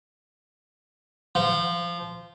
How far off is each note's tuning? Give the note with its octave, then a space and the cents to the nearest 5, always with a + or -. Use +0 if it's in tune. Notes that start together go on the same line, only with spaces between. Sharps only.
F3 -15